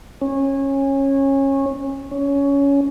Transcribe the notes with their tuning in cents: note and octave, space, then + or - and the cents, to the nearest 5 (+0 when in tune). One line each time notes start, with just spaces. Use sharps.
C#4 -20
C#4 +15